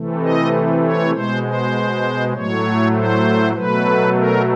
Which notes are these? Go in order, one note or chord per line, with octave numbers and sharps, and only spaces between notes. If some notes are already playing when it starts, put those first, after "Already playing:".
Already playing: C3 E3 A3
D#5
C#5
B2 G#3 C5
C5
A2 F#3 A3 C#5
C5
B2 F#3 A3 B4
A#4